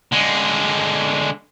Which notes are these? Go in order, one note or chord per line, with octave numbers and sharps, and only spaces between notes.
D3 G#3